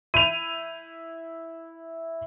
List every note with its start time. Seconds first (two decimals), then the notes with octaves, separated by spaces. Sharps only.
0.14 E4 D#7 F7